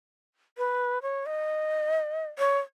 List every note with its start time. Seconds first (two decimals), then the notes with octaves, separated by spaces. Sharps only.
0.58 B4
1.02 C#5
1.26 D#5
2.38 C#5